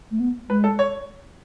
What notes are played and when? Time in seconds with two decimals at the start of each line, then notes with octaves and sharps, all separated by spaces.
0.11 A3
0.20 B3
0.49 G#3 B4
0.64 A4
0.79 C#5